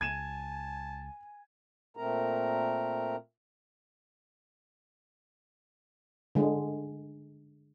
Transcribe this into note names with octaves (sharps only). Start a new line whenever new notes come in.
C#2 G#5 A5 G#6 D#7 E7
A#2 A3 C4 A#4 A#5
D3 G#3